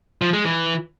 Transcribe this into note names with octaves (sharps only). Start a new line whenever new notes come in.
F3
G#3
E3